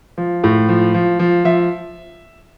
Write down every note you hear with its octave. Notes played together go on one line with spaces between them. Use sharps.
F3
A2
F3
F3
F3
F3 E5